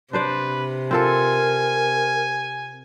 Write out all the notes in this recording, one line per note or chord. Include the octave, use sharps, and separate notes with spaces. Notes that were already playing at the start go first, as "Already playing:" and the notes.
C3 D4 B4 C5 D5
C4 F4 A4 A#4 G#5